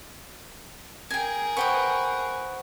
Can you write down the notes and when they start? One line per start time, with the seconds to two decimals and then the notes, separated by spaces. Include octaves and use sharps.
1.10 G#4 A#4 G5 G#5
1.57 B4 C5 F#5 G5 C#6 D#6